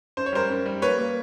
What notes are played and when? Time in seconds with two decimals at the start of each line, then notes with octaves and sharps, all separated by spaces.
0.17 F#2 C5
0.26 C#5
0.33 G3 A#4 C5
0.50 F#2
0.66 G3
0.82 A#3 B4 C#5
0.99 A#3